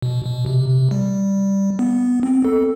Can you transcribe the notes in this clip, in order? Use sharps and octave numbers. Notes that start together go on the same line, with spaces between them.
B2
B2
C3
C3
G3
B3
C4
A4